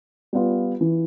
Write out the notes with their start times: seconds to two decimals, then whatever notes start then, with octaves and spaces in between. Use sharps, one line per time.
0.33 G3 B3 F4
0.81 E3